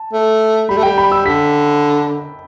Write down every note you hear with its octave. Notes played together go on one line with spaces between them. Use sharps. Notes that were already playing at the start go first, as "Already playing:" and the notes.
Already playing: A5
A3
G3 B5
A3
G3 G5
B5
E6
D3 B6